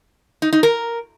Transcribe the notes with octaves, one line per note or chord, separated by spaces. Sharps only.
D#4
D#4
A#4